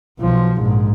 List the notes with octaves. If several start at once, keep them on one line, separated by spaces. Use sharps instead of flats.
B1 F3
A#1 G#2